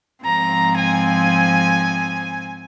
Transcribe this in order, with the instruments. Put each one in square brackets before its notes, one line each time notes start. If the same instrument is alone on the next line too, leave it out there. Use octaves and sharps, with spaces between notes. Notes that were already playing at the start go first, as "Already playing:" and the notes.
[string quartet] G#2 F3 C4 A#5
G#5